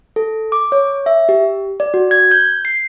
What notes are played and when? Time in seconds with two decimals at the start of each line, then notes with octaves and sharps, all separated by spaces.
0.16 A4
0.52 D6
0.72 C#5
1.06 E5
1.29 G4
1.80 D5
1.94 F#4
2.11 G#6
2.31 G6
2.65 C7